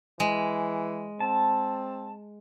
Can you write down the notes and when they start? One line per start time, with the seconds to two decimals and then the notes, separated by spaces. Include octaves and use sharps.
0.20 E3 G#3
1.20 C4 A5